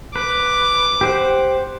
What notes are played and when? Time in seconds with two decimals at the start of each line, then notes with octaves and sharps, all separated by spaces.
0.16 B4 D6
1.01 G4 C5 F#5